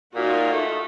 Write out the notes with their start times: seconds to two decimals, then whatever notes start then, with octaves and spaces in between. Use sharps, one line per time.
0.15 A#2 D#4 F4 F#4
0.52 A3